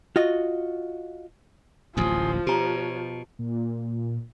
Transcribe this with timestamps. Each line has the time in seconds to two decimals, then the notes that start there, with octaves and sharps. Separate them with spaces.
0.16 F4 F#4 D#5
1.97 D1 A1 D#2 F3 G#5 C6 D#6
2.47 B2 G4 C#5 A#5
3.39 A#2